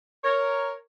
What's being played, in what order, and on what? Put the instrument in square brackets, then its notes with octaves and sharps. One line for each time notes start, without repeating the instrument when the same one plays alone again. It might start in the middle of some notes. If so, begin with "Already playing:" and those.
[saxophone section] A#4 C#5